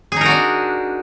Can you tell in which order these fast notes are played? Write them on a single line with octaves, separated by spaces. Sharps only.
G#4 D#4 A#4 F#4 D4